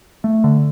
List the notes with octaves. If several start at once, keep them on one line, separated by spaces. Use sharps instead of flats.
A3
D3